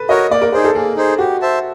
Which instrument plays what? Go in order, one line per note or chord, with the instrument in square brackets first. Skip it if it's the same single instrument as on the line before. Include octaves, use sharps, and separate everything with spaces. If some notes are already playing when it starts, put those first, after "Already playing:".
Already playing: [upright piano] A4 B4
[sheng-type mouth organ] F#4 A#4 C#5 [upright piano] D#5
[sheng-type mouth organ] A#3 [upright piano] D5
[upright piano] A#4
[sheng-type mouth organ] D#4 G#4 C5 [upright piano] A#4
[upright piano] A4
[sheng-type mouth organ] A#3 [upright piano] G#4
[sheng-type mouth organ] D#4 G#4 C5
[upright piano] F#4 [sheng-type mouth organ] G4
[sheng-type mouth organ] C5 E5 A5